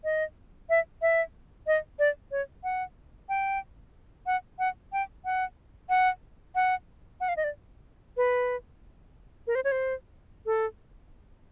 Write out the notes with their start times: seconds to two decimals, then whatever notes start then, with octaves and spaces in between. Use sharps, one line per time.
0.04 D#5
0.70 E5
1.02 E5
1.67 D#5
1.99 D5
2.31 C#5
2.64 F#5
3.29 G5
4.26 F#5
4.59 F#5
4.93 G5
5.25 F#5
5.89 F#5
6.55 F#5
7.20 F#5
7.29 F5
7.37 D#5
7.44 D5
8.17 B4
9.47 A#4
9.55 C5
9.64 C#5
9.72 C5
10.46 A4